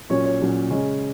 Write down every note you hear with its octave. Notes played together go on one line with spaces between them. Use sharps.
A#2 F#3 C#4 C#5
C#5
A#2 F#3 C#4
C#3 G#3 C#4